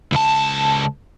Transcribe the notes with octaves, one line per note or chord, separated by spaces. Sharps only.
C#2 A5